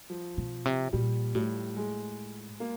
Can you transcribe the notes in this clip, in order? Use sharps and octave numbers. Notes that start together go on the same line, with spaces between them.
F3
B2
C3
A#2 G3
A2 G3
G#3
A#3